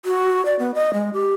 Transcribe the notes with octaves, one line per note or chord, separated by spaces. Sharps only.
F#4
D5
B3
D#5
G#3
G4